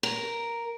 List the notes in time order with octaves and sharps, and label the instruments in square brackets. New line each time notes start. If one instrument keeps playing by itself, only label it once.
[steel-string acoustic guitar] A#4